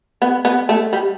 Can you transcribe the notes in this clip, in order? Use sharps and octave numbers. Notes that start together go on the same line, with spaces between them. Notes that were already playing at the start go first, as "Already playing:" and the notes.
B3
B3
A3
G3